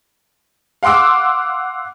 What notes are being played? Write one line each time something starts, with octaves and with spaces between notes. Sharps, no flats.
F5 F#5 C6 D6 E6